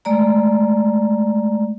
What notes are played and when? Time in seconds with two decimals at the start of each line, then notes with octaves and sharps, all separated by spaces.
0.05 G#3 A3 D5 A#5